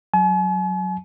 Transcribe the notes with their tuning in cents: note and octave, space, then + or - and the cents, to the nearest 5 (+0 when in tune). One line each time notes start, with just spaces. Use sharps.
F#3 -5 G#5 +45